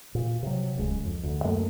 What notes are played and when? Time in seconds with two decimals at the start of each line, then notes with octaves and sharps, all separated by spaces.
0.15 A#2
0.43 C3 F#3
0.75 D1 C#2 G#3
1.05 F2
1.23 D2
1.44 F#2 A3 A#3